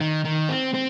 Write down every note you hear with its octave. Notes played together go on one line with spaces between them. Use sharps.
D#3
D#3
C4
C4